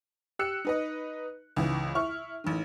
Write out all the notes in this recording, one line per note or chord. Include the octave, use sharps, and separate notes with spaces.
G4 E6 F#6 C#7
D#4 B4 D#5
C#2 G#2 E3
E4 C#6 F6
A1 D#3